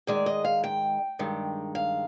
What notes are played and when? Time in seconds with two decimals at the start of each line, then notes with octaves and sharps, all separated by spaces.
0.07 G#2 D#3 G#3 D5
0.26 D#5
0.44 F5
0.64 G5
1.19 G2 D#3 G#3
1.75 F5